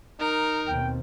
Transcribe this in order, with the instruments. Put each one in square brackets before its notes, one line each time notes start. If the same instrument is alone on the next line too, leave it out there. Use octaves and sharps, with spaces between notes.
[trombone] D#4 [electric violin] A#4
[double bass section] D#2 B2 C4 [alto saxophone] G5